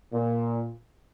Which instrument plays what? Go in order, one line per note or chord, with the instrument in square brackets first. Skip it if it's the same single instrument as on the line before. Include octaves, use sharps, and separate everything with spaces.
[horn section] A#2